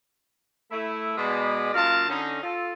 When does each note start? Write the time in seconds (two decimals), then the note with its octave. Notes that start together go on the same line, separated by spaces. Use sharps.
0.71 A3 E4
1.17 B2 G#3 D5
1.73 F#2 A#3 F4 A#4 F5 A5
2.09 D3 C#4 D#4
2.43 F4 A4